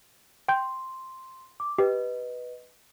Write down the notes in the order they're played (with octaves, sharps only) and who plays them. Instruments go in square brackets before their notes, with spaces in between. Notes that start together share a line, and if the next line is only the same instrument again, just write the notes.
[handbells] G5 G6 [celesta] C6
[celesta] D6
[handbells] G4 [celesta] B4 D#5